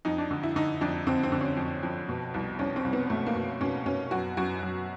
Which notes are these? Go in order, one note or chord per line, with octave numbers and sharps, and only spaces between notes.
F2 D#4
D4
D3
E4
D3 D#4
F2 D4
D3 C4
C4
D3
C#4
F2
F2
B2
C2
C2 C#4
C4
C2
B3
B2 A3
A#3
B2
B2 C#4
B2 C#4
F#2 F#4
F#2 F#4
F#2